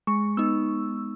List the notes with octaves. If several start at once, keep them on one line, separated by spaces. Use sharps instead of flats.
G#3 C#6
B3 D#4 E6